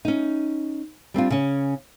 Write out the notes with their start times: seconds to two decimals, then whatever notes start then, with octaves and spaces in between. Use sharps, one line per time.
0.05 C#4 D#4
1.14 G3 C4 D4 F4
1.30 C#3 C#4